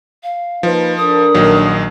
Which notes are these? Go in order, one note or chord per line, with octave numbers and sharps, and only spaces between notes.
F5
F3 A#3 D#4 B4
D4 A4 A#4 D#6
A#1 D#3 F#3